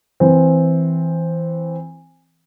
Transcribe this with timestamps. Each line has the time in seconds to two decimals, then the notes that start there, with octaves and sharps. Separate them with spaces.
0.20 E3 C4